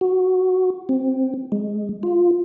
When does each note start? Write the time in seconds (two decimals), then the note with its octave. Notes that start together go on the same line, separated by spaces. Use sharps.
0.01 F#4
0.89 C4
1.52 G#3
2.03 F4